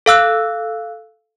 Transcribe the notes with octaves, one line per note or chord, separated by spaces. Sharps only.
A4 F5 E6 F#6